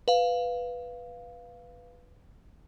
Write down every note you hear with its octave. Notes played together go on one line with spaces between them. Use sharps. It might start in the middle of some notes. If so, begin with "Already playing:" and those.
B4 F5